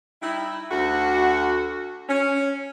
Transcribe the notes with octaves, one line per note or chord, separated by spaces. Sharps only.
G3 D#4 E4
D2 F#4
C#4